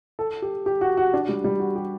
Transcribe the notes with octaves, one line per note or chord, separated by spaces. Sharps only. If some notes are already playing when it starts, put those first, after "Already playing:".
A4
G4
G4
F#4
F#4
D4
G3
G3
F#4
G4